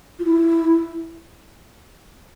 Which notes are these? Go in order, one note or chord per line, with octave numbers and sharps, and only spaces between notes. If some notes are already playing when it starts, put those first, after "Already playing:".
F4
E4